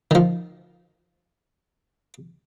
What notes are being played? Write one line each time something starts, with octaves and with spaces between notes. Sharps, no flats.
D#3 F3